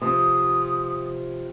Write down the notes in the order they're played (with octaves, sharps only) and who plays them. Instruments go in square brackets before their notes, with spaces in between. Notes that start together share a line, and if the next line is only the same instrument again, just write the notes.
[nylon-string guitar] C3 F3 [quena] D#6